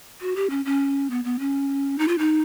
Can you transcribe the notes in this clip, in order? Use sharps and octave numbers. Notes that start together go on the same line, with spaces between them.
F#4
G4
C#4
C#4
B3
B3
C#4
D#4
F4
D#4